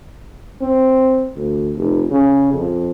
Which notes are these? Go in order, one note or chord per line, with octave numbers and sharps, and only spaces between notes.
C4
D2
F1
C#3
F2